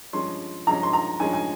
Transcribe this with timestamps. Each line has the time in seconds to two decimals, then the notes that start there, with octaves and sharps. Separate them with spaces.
0.13 G2 F3 G#3 C#4 C6
0.67 G2 F3 G#3 C#4 A#5
0.83 C6
0.93 A#5
1.20 G2 F3 G#3 C#4 G#5
1.33 G#5